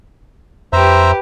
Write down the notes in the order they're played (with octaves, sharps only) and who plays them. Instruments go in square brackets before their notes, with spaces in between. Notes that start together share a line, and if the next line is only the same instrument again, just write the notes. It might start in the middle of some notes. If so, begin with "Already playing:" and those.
[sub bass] F2 [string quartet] G4 B4 [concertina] C5 E5 A#5